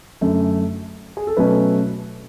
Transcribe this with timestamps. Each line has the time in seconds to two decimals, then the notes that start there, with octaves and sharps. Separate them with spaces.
0.21 F#2 D3 A3 C#4
1.17 G#4
1.27 A4
1.37 B2 F#3 A3 C#4 B4